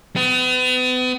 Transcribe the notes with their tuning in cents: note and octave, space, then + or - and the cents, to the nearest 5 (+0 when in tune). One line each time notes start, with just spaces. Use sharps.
B3 +40